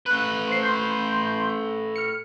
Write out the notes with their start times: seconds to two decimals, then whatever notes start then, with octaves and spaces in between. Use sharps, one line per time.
0.06 A3 B4 F#6
0.48 C5 C7
0.63 C6 G6
1.96 F6 C#7